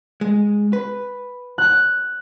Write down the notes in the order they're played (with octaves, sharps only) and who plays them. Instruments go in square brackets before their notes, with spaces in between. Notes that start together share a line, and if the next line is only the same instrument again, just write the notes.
[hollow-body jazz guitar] G#3
B4
[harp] F#6